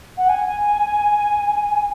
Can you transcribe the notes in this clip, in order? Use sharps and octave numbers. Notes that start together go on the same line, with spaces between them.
F#5
G#5